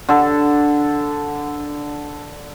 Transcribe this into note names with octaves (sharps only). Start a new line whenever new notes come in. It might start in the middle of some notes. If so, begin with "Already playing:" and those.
D3 A4